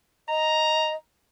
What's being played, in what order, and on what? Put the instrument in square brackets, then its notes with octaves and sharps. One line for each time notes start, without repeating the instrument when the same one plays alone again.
[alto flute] D#5 [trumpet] A#5